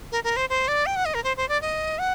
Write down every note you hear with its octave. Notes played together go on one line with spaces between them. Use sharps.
A#4
A#4
C5
C5
D5
G5
F#5
D#5
A#4
C5
C5
D5
D#5
F#5